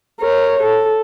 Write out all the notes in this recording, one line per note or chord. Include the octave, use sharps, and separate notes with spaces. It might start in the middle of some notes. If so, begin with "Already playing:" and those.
A#4 C#5
A4